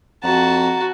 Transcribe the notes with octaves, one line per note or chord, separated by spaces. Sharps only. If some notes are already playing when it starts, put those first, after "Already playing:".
F2 F#4 A5 A#5